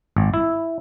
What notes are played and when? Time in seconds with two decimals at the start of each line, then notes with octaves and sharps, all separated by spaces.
0.16 G#1
0.34 E4